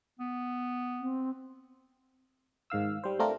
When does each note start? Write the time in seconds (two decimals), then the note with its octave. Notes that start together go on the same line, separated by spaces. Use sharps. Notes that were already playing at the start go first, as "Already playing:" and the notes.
0.20 B3
1.00 C4
2.70 G#2 D#3 F5 E6
3.04 G3 C5
3.19 A3 C4 D4 F4 A#4